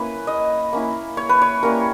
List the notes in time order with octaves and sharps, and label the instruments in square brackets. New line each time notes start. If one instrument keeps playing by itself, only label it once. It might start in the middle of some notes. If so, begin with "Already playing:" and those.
Already playing: [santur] A#3 C#4 E4 B4
D#5
A#3 C#4 E4
C#5
B4
C#5
G3 A#3 C#4 E4 A#4